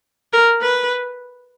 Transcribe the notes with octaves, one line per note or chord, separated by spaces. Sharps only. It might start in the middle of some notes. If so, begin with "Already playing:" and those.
A#4
B4